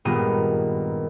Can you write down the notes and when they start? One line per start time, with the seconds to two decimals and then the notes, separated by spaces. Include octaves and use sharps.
0.05 G#1 G2 A#2 B3 A#4 D#7